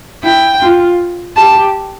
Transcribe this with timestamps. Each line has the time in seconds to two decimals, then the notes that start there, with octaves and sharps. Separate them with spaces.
0.23 E4 G5
0.61 F4
1.36 G4 A5